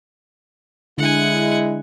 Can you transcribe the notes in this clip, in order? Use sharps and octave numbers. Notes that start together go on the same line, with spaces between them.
D3 G#3 E4 F#5 G#5